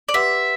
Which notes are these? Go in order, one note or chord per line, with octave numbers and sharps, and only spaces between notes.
D5
G4 B4 E5 F#5 C6